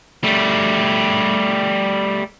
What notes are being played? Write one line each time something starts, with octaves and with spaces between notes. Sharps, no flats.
G3 A3